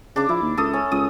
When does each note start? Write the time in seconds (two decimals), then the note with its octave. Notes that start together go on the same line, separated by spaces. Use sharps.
0.16 C#3 D4 D6
0.29 F3 E4
0.42 D#2
0.57 C#2 A4 D#6
0.73 C#4
0.92 C#2 D#6